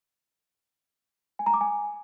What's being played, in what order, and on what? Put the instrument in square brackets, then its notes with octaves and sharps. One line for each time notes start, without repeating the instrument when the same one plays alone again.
[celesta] G#5
A#5
D6
G#5